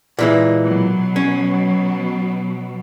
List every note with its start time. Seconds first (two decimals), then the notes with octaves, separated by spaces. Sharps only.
0.19 A#2 E3 G#3
0.64 B2 F#3
1.16 C#4